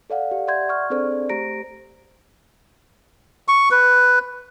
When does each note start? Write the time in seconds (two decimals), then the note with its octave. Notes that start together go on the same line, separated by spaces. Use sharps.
0.10 A4 D5 F5 F#5
0.31 G4
0.47 D5 E5 F#5 C6 G6 G#6
0.69 C#6 F6
0.90 C4 D4 G#4 A4 C5 D5
1.29 A3 G4 C5 A#5 A#6 D7
3.48 C#6
3.71 B4